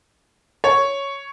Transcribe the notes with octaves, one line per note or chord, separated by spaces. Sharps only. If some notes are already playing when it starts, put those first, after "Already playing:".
C#5